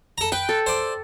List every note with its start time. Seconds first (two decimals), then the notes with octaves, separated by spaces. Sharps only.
0.18 A4 A#5
0.32 B4 G5
0.49 A4
0.66 C5 D5